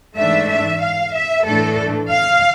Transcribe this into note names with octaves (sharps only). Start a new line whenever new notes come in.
G#2 E3 A3 D4 E5
E5
F5
E5
A2 E3 A3 D4 A4
F5